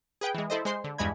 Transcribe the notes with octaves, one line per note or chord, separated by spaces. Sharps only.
G#4 B4 G5
E3 G#3
E4 A4 C5 D#5
G#3 C5 C6
D3
E2 G2 G#3 D#5 B5 G#6